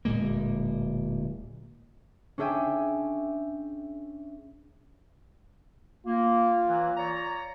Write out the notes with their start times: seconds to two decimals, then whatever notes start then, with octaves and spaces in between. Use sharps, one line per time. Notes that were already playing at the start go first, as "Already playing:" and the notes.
0.05 D1 A#2 G#3 A#3
2.38 C#4 D4 G#4 E5 G5 G#5
6.06 A#3 F4
6.67 E3 F#3
6.97 C#5 D5 A#5